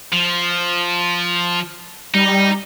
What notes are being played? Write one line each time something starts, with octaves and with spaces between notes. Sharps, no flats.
F3
G3 D#4